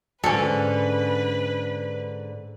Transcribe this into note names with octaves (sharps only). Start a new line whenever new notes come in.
G#2 D3 C#4 A4 B4